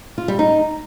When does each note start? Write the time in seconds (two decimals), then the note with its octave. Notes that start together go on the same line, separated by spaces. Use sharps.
0.18 F4
0.28 G3
0.39 D#4